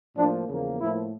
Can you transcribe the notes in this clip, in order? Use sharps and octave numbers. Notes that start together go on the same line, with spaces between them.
A2 F3 A#3 D4
E2 C#3 F3 A#3
A2 F3 A#3 E4